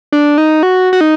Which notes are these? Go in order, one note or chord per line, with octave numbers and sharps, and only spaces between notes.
D4
D#4
F#4
F#4
D#4